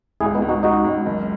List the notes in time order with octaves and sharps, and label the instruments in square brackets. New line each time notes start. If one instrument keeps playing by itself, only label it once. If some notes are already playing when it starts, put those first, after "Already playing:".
[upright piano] C#2 [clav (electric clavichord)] E4 G#4
[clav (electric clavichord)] B3 D#4
[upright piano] C#2
[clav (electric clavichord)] D#4 F#4
[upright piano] C#2 [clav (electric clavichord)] D#4 F#4
[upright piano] C#2
F#1